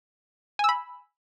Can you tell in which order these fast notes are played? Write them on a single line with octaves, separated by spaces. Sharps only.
G#5 E6 B5